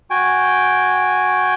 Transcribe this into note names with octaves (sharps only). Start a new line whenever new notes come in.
F#4 G5 G#5